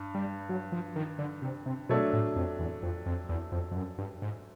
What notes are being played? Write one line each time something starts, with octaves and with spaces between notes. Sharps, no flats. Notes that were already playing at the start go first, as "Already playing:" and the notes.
Already playing: G2
G3
F#3
F3
D#3
D3
C3
C3
B2 F#3 A3 D4
A2
F2
E2
F2
F2
E2
F2
F2
F#2
G2
G#2